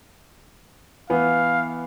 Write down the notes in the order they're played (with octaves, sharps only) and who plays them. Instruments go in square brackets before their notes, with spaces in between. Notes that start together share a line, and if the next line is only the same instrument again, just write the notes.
[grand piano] E3 B3 [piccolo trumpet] F5